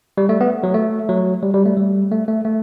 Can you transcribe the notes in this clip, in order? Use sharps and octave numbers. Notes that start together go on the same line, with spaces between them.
G3
A3
B3
F#3
A3
F#3
G3
G3
A3
G3
A3
A3
A3